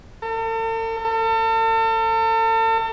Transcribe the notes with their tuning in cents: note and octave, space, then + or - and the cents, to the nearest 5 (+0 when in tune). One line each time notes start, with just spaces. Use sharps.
A4 +45
A4 +40